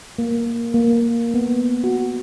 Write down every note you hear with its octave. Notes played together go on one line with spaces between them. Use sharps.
A#3
A#3
B3
F#4